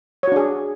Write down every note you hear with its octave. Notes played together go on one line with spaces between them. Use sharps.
D4 F#4 G#4 C#5